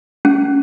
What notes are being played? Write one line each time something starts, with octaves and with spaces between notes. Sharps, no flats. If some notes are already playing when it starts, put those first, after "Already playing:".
C#4